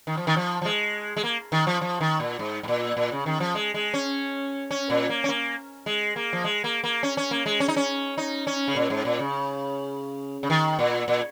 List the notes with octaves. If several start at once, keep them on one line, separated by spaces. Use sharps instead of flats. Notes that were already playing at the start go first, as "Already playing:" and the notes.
D#3
F3
D#3
F3
F3
G#3
G#3
A#3
D#3
F3
F3
D#3
A#2
G#2
G#2
A#2
A#2
C#3
D#3
F3
G#3
G#3
C#4
C#4
A#2
A#3
C#4
A#3
G#3
A#3
F3
G#3
A#3
A#3
C#4
C#4
A#3
G#3
C#4
D#4
C#4
D#4
C#4
C#3
A#2
G#2
A#2
C#3
C#3
D#3
A#2
A#2